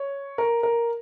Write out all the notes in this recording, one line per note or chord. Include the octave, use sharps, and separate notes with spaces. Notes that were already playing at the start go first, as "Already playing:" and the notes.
Already playing: C#5
A#4
A#4